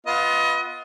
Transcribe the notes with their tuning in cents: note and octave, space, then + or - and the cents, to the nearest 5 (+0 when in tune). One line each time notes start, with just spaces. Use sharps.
B3 -5 F4 +0 D#5 +30